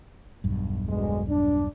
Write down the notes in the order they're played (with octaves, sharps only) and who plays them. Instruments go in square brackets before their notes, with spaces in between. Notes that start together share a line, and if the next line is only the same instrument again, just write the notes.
[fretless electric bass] E1 B1 G2
[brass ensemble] D2 B2 G#3
D4